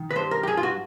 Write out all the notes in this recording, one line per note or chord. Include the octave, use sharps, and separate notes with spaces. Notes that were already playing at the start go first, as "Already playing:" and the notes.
Already playing: D#3
B4
G2 C5
A#4
G4
G2 G#4
F4
F#4